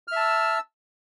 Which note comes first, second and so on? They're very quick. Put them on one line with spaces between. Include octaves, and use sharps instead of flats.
F6 E5 A5 E6